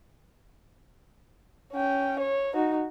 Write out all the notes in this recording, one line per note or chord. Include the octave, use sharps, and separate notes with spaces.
C#4 G5
C#5
D#4 F#4